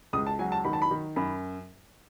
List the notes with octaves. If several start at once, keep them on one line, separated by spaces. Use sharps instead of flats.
C#2 D#6
A5
F#3 G#5
A5
D#3 B5
A5
B5
D#3
F#2 B5